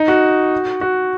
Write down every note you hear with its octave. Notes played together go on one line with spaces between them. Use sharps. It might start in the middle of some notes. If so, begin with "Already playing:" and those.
Already playing: D#4
F#4
F#4